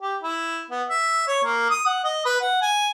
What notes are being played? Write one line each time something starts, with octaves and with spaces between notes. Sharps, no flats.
G4
E4
B3
E5
C#5
A#3
D#6
F#5
D#5
B4
F#5
G#5